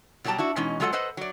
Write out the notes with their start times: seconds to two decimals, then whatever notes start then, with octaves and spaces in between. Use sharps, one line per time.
0.24 B2 F#3 G3 G4 A5 A#5
0.38 D4 E4 F#4
0.56 B2 E3 G#3 C#4 D#4
0.80 F#3 G#3 F4 A4 E5 F#5
0.93 A4 B4 C5 D#5 F#5
1.17 F#3 D5